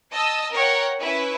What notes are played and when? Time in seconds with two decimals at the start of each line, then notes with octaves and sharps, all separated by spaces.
0.12 D#5 A5 E6
0.54 A#4 C#5 F#5 G5
1.01 C#4 E4 B4